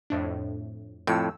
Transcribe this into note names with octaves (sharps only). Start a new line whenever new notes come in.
F2 A2 D4
F2 A2 E6